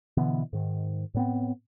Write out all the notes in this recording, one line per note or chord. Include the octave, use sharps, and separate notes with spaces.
B2 D3 E3 B3
G#2 D#3
A2 B3 C4